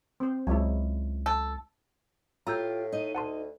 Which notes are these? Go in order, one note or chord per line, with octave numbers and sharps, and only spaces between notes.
C4 C5
C#2 F#3 G#3 E4
A4
A2 F4 G4 A#5 E6 G6
D#4 D#5
D2 F#5 A5 C6